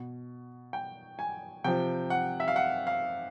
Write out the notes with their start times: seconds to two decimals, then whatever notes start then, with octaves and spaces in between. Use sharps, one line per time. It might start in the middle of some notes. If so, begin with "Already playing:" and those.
Already playing: B2
0.73 G5
1.19 G#5
1.64 C3 F3 G5
2.10 F#5
2.40 E5
2.48 F5
2.56 F#5
2.87 F5